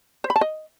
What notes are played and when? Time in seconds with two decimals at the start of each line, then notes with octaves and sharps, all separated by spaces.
0.24 C5
0.30 B5
0.36 A5
0.41 D#5